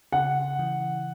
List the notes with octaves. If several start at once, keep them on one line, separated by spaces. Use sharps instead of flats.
C#3 F#5
E3